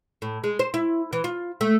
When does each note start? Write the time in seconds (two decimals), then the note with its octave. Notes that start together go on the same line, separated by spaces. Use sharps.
0.22 A2
0.44 G#3
0.59 C5
0.74 E4
1.13 E3
1.24 F4
1.61 A3